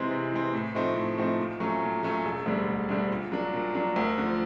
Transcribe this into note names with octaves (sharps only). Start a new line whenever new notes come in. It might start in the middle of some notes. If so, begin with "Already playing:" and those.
Already playing: C3 E3 G#3 C4
C3
E3 G#3 C4
A2
F3 A3 C4 D#4
A2
F3 A3 C4 D#4
A#2
F#3 A3 C#4
A#2
F#3 A3 C#4
E1
D2 D3 G3
E1
D2 D3 G3
A#2
F#3 A#3 D4
A#2
F#3 A#3 D4
D2
D3 F3